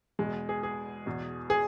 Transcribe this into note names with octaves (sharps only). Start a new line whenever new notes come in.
E2 B2 G#3
G#4
G#4
E2 B2
G#4